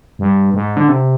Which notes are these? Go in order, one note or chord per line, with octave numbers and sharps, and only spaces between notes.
G2
G#2
D3
C3